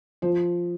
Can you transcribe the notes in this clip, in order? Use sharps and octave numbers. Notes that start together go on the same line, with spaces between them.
F3 C5